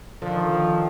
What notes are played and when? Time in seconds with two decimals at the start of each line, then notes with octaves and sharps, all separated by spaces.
0.22 D3 D#3 F3